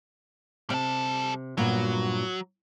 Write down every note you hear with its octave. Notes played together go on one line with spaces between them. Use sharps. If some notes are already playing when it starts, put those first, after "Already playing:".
C3 G3 A4
G2 A#2 F#3 B3